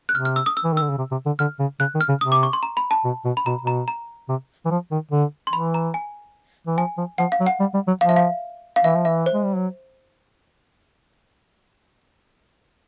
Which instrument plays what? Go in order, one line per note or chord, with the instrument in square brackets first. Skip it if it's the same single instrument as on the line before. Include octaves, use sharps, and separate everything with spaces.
[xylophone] F#6
[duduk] C3 [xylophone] F6
[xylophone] F6
E6
D#6
E6
[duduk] E3
D#3
[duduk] D3 [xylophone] E6
[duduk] C#3
C3
C3
D3
[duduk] D3 [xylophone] F6
[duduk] C#3
[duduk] C#3 [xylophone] F#6
[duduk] D#3
[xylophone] F6
[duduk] C#3
[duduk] C3 [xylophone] D#6
[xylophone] D6
C#6
C6
A#5
B5
A5
[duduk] B2
B2
[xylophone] B5
[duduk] B2 [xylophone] A#5
[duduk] B2
[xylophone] A#5
A#5
[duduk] C3
E3
F3
D#3
D3
[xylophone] C6
[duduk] E3 [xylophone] B5
[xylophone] A#5
G#5
[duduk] E3
[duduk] F3 [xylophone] G#5
[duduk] F3
[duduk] F3 [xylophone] F#5
[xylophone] F5
[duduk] F#3
[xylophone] F#5
[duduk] G3
G3
F#3
[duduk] F3 [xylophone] F5
[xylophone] E5
F5
F5
[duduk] E3 [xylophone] E5
[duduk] F3
[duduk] E3 [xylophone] E5
[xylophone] C5
[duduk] G#3
G3
F#3